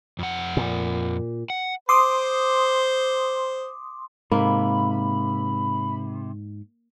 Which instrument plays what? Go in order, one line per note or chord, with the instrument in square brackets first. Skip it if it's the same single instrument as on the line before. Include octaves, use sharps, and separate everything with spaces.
[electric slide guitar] F2 F#5
[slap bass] A#2
[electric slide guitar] F#5
[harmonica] C5 [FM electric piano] C6 D6 D#6
[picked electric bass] G#2 [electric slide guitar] C3 [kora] A#3 [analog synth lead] B5